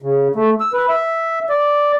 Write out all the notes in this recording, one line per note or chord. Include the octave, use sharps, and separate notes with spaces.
C#3
A3
E6
B4
E5
D5